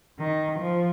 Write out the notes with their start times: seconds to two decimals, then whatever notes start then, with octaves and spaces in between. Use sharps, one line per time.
0.19 D#3
0.59 F3